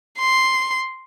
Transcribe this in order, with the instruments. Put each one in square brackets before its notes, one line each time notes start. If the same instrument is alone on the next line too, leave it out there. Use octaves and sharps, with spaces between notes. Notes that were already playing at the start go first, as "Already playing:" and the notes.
[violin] C6